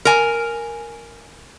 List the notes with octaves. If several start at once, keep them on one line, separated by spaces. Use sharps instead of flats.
A#4 G#5